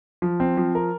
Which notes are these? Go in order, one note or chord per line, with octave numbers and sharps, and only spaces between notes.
F3
C4
F3
A#4